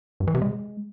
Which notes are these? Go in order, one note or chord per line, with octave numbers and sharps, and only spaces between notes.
G2
E3
C3
G#3